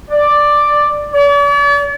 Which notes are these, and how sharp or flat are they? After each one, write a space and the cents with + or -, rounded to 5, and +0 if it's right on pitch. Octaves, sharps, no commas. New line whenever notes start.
D5 +5
D5 -45